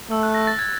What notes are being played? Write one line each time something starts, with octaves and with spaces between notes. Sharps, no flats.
A3 E6
F#6
A#6
A6
G#6